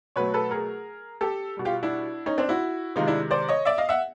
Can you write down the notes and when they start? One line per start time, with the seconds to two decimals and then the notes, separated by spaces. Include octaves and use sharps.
0.16 B2 F#3 A3 B4 C#5
0.34 A4 B4
0.51 G#4 A#4
1.21 G4 A4
1.57 B2 G3
1.65 F4 G4
1.83 D4 E4
2.26 C#4 D#4
2.38 C4 D4
2.49 E4 F#4
2.96 C3 D#3 G#3 D#4 F4
3.07 D4 E4
3.31 C5 D5
3.48 C#5 D#5
3.65 D5 E5
3.78 D#5 F5
3.89 E5 F#5